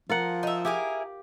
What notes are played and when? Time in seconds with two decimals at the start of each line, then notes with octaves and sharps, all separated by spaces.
0.09 F3 F4 A#4 F#5
0.43 D#4 E5
0.65 E4 G4 G#4 A#4